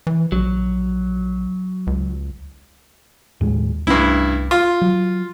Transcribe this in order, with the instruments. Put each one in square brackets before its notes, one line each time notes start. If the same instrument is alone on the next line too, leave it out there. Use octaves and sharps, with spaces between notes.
[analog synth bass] E3
[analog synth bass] A#1 [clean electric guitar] F#3
[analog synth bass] C#2
[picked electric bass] D#2 A2 G#3
[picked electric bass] C2 A3 C#4 [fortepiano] G2 E4
[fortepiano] F4
[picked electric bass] F#3